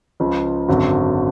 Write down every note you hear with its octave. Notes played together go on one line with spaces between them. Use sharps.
C#2 C#3 F3
G#1 F#2 D3 F#3